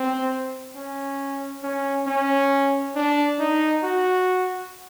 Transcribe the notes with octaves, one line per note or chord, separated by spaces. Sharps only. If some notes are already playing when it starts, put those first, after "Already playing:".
Already playing: C4
C#4
C#4
C#4
D4
D#4
F#4